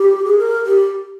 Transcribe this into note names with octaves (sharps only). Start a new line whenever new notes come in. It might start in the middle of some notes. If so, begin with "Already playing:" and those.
Already playing: G4
G#4
A#4
G4